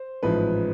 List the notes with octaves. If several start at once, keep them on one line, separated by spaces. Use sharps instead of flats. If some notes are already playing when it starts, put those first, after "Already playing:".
Already playing: C5
A1 G#2 F3 B4